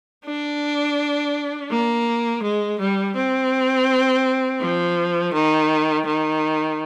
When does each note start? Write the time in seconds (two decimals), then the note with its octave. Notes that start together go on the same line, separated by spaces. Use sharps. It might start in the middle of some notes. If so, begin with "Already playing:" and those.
0.25 D4
1.71 A#3
2.42 G#3
2.79 G3
3.16 C4
4.61 F3
5.34 D#3
6.06 D#3